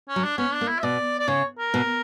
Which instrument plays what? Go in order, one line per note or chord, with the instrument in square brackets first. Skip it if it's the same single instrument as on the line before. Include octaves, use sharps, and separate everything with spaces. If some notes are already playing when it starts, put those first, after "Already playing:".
[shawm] C#4
[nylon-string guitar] F#3
[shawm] D4
[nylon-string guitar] B3 [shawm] C#4
[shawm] D4
[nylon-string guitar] A#3
[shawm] E4
E5
[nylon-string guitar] B2 [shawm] D5
[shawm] D5
[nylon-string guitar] C#3 [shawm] C#5
[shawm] A#4
[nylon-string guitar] B2